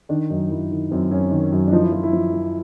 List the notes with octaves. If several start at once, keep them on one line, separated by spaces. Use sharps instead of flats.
D#3 D4
F#2 D#4
F#2 E4
D#3
F#2 C4
F#2 C#4
D#3
F#2
D4
F3 D#4
E4
F3 F4
E4
F3
F3